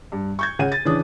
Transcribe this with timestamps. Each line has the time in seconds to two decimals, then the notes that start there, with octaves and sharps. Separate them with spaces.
0.12 G2
0.39 C#6 G6 G#6
0.59 C#3 F#5 D#7
0.72 A6
0.85 C#3 E3 D4 D#6